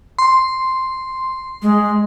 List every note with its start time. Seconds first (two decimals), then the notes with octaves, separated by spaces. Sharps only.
0.19 C6
1.62 G#3